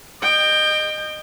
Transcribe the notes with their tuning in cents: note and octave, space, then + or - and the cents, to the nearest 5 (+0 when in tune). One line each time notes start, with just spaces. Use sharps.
D#5 -20 G5 +15